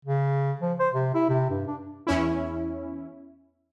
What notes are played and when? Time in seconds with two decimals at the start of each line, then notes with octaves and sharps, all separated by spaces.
0.05 C#3
0.61 F3
0.79 C5
0.94 C3
1.15 E4
1.29 C3
1.50 G2
1.67 D4
2.07 E2 C#4 E4